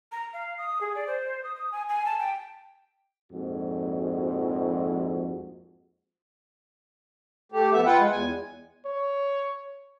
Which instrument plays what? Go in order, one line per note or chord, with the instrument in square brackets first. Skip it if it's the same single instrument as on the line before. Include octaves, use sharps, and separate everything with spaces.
[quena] A#5
F5
D#6
G#4
D5
C5
D#6
D#6
G#5
G#5
A5
G5
[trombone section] A#1 F2 G#2 F#4
[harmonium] A3 G4
F2 B3 E5
F4 B4 F#5 G5
G#3
E2 G#5
[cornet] C#5